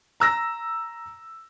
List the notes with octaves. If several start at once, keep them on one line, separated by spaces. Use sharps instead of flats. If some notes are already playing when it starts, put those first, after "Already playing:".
A#5 E6 A#6